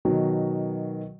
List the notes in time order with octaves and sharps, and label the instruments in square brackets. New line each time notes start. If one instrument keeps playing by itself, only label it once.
[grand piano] B2 D#3 F#3